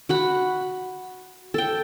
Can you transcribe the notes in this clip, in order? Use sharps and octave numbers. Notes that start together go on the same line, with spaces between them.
F#4 F#5 B5
A4 G5